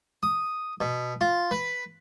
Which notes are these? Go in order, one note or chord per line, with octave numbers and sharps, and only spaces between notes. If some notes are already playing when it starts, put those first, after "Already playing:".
D#6
B2
F4
B4